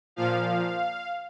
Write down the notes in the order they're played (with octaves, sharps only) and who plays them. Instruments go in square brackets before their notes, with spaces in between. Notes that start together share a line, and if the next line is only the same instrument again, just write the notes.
[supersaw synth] A#2 F3 F5